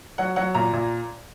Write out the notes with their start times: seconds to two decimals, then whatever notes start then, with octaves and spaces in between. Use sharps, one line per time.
0.18 F#3 F#5
0.36 F#3 F#5
0.54 A#2 A#5
0.73 A#2